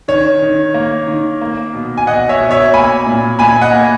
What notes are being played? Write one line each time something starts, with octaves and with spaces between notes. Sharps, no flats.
D#3 C#5
D#3
A#3
D#3
A#3
B2
G#5
B2 D#5 F#5
C#5 E5
B2
C#5 E5
A#3 G#5 B5
A#2
A#2 G#5 B5
D#5 F#5
A#3